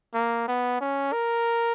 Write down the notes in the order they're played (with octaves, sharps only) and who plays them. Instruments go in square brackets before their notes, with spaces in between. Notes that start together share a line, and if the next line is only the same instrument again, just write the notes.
[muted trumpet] A#3
B3
C#4
A#4